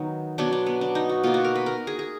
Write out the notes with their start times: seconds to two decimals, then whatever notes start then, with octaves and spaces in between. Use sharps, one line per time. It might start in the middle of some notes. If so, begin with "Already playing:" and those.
Already playing: D#3 F#3 B3 D#4
0.38 B2 F#3 B3 D4
0.52 D4
0.66 B3
0.81 D4
0.95 D#4
1.09 F#4
1.23 B2 A#3 F4
1.34 F#4
1.44 A#4
1.55 B4
1.66 A#4
1.87 G#4
1.99 G#4